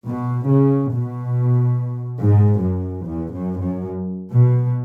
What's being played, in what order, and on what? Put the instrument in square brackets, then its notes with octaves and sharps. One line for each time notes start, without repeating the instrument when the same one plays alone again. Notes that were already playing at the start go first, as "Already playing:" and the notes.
[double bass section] B2
C#3
B2
G#2
F#2
E2
F#2
F#2
B2